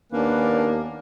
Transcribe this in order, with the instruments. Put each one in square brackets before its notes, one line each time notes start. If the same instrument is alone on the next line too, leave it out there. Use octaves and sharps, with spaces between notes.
[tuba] D#2 [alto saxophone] A#3 [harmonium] B3 C#4 B4 [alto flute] D4